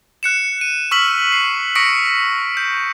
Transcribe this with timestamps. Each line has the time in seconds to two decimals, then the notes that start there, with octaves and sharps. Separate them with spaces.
0.23 F#6 C#7 E7
0.61 D#7
0.91 C#6 E6 F6 B6 F#7
1.32 C7
1.75 C#6 D#6 A#6 B6 C#7 D7
2.57 G6